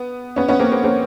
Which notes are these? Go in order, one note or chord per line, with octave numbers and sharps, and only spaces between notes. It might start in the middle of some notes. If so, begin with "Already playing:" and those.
Already playing: B3
B3 C#4
B3 C#4
A#3 C4
A#3 C4
A#3 C4